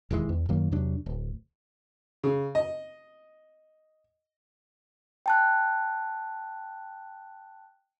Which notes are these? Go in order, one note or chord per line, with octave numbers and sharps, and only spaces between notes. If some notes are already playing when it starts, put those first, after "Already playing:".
E1 D#2 E3 G#3
E2
F#2 D#3 F#3 A#3
E2 C3 F#3 D4
D1
C#3
D#5
G5 A5 F#6